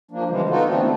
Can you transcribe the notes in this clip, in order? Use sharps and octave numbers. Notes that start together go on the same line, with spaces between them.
F3 A#3 D4
C#3 E3 F3 G3 G#3
B3 D#4 F4 F#4 A4
D3 E3 A3 B3 C4 D4
A#3 E4